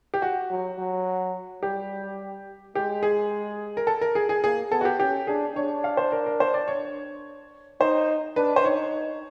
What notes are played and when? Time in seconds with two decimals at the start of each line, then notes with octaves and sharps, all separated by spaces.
0.14 G4
0.22 F#4
0.50 F#3
0.78 F#3
1.62 G3 G4
2.75 G#3 G4
3.03 G#4
3.77 A#4
3.87 A4
4.01 A#4
4.15 G#4
4.29 G#4
4.43 A#3 G#4
4.71 B3 A4
4.81 F#4
4.85 G4
5.00 C#4 G4
5.27 D4 G#4
5.56 D4 C#5
5.84 F5
5.97 C5
6.12 A#4
6.26 A#4
6.40 C5
6.54 D5
6.68 C#5
7.81 D#4 C5
8.36 D4 B4
8.56 C5
8.64 D#4 C#5